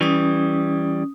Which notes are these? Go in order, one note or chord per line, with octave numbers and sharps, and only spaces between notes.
E3 G3 C#4 D#6